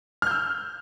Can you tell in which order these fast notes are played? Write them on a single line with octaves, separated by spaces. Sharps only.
F6 G6 E6